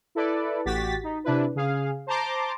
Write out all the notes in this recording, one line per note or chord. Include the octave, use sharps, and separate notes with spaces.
E4 A4 B4 D5
A1 F#4 G4 A6 B6
D#4
C3 D4 E4 B4
C#3 G#4 F5
C5 A5 A#5 C6 D6